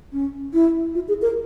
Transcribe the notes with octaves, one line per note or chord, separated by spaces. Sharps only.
C#4
E4
F4
G#4
A#4